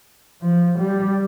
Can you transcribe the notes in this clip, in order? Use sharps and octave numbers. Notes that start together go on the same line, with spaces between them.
F3
G3